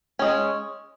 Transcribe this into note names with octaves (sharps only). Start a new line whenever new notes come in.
G#3 C#4